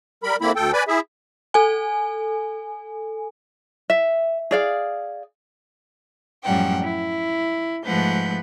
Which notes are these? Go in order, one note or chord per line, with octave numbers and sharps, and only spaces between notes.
G3 A#4 B5
D3 A#3 C4 E4 B5
D2 A4 G5
B4 D5 G#5 B5
E4 G#4 E5
A4 G#5
E5
G#4 D5 F5
F#2 A2 F3 G3 F#5 G5
E4
G#2 F3 A3 B4 F#5 G6